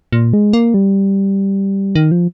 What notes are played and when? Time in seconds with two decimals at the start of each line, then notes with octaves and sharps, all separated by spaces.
0.12 A#2
0.33 G#3
0.53 A#3
0.74 G3
1.95 D#3
2.11 F3